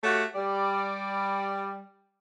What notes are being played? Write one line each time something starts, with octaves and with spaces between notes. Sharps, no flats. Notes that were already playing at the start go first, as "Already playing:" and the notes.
A3 F#4 G4 C#5 F5 F#5
G3 D5